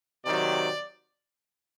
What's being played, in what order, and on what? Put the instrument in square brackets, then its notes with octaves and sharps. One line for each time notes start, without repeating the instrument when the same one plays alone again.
[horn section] C3 D#3 F#3 D5